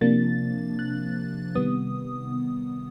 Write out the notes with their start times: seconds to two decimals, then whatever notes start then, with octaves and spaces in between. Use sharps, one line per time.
0.01 C3 F3 A#3 D4 A6
0.79 F#6
1.55 C3 D#3 G3 B3 D#6